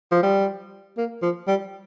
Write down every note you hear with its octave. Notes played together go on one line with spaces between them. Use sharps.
F3
G3
A#3
F3
G3